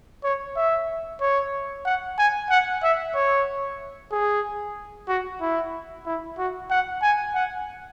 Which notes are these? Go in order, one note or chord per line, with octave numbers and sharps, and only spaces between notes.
C#5
E5
C#5
F#5
G#5
F#5
E5
C#5
G#4
F#4
E4
E4
F#4
F#5
G#5
F#5